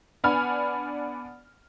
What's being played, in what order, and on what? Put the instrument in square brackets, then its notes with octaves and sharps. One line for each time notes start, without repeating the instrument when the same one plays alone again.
[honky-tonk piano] B3 D4 F#5 G#5 B5 F6